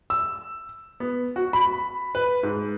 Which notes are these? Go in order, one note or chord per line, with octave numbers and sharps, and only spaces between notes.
E6
B3
F#4
B5
B4
G#2